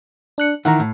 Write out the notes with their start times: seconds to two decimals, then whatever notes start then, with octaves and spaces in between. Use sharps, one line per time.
0.38 D4 F#6 C#7
0.65 D#3 E3 F#5 A#5
0.80 A2